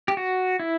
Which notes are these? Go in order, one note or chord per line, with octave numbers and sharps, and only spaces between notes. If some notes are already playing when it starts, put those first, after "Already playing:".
G4
F#4
E4